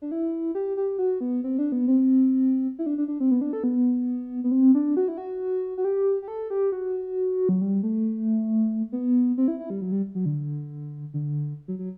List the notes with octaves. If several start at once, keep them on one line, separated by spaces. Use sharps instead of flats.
D4
E4
G4
G4
F#4
B3
C4
D4
B3
C4
E4
D4
D4
D4
C4
B3
D4
A4
B3
B3
C4
D4
F#4
E4
F#4
F#4
G4
G4
A4
G4
F#4
F#3
G3
A3
B3
C4
E4
E4
G3
F#3
G3
F#3
D3
D3
F#3
F#3